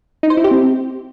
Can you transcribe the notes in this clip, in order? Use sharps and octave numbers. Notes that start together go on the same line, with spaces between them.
D#4
C5
E4
G4
C4